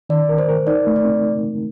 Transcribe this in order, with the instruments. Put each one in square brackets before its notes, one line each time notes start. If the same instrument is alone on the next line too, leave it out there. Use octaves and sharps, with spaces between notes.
[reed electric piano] D#3 [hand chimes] D5
[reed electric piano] A#4
[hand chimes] C5
[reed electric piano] A#4
[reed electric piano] D#4 [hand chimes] D5
[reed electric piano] A3
[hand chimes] D5
[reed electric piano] C4